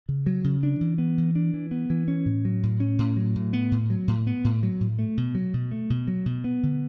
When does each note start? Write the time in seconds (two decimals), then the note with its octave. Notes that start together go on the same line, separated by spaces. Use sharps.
0.09 C#3
0.26 F#3
0.44 C#3
0.63 D4
0.81 E3
0.98 B3
1.18 E3
1.35 D4
1.54 E3
1.71 B3
1.90 E3
2.08 C#4
2.26 A2
2.45 F#3
2.63 A2
2.80 C#4
2.99 A2
3.17 F#3
3.36 A2
3.53 B3
3.72 A2
3.90 F#3
4.08 A2
4.27 B3
4.44 A2
4.63 F#3
4.81 A2
4.99 A3
5.17 B2
5.35 F#3
5.54 B2
5.71 A3
5.90 B2
6.08 F#3
6.26 B2
6.44 B3
6.63 D3